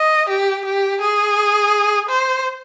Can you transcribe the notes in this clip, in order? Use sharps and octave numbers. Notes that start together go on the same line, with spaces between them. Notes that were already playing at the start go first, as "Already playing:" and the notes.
Already playing: D#5
G4
G4
G#4
C5